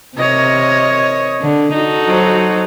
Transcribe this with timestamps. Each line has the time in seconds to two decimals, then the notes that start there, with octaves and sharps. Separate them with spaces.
0.17 C3 A#4 C#5 D#5
1.42 D3
1.74 D#4 F#4 A4
2.08 F#3 C5